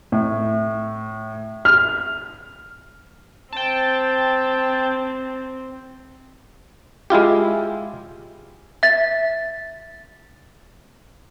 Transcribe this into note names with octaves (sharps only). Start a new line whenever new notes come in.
A2
F6
C4 G5 A5
G#3 E4 F4 G4
E5 A6